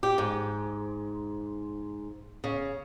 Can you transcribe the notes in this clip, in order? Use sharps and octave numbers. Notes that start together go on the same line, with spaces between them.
G4
G#2
C#3